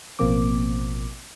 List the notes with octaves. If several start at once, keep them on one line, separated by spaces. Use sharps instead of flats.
A1 B2 F3 A#3 C4 D6